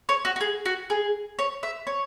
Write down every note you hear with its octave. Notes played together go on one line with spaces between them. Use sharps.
C#5
F#4
F#4
G#4
F#4
G#4
C#5
E5
C#5